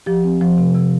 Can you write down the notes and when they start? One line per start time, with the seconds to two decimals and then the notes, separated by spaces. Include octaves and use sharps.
0.06 F3 G4
0.24 C4
0.41 F3
0.58 C3
0.74 C3